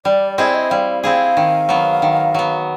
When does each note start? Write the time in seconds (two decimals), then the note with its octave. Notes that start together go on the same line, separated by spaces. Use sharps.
0.05 G3 D5
0.38 C4 E4 G#4 D#5
0.46 D5
0.55 D#5
0.70 G3 F5
1.03 C4 E4 G#4 F5
1.37 D#3
1.69 F#3 B3
2.02 D#3
2.34 F#3 B3